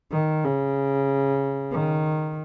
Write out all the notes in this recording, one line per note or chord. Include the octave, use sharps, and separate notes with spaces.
D#3
C#3
D#3